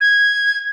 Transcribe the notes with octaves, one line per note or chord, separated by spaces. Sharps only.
G#6